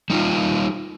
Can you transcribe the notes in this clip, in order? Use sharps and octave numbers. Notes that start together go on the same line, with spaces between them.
G3 D#4 F4